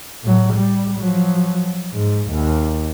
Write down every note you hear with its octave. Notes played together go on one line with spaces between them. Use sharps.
A2 F#3
G3
F3 F#3
G#2
D#2